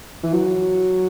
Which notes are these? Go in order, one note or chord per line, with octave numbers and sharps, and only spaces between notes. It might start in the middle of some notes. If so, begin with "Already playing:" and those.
E3
F#3